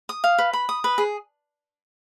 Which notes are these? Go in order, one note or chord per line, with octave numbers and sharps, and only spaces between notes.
D#6
F5
B4
B5
D#6
B4
G#4